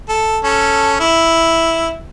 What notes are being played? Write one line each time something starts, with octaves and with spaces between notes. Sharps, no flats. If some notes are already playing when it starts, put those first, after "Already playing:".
A4
C#4 A4
E4